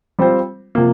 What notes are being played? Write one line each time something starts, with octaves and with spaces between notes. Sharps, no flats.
G3 C4 F4 C5
C3 F3 A#3